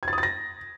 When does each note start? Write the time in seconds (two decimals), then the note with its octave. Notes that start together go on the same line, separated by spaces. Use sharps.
0.03 G#6
0.08 A6
0.13 D#6
0.18 A6
0.23 A#6